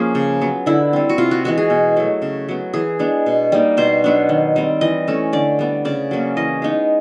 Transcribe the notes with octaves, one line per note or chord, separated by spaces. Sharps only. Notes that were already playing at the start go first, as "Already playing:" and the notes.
Already playing: F3 A#3 C#4 G#4
C#3
F#3 B3
D3 E4
G3 C4
F#4
C3 F4
F#4
E3 G#3 B3 F#4
G#4
B2
F#3 A3
C#3
F#3 B3
E3 G#4
G#3 B3 D4
B2
G3 A#3 D#4
B2 C5
F#3 B3 D4
D#3
G3 C4
E3 D#5
A3 C#4
D3 D5
G3 B3
C#3 D5
F#3 A#3 C#4
E3 D#5
G#3 B3 D#4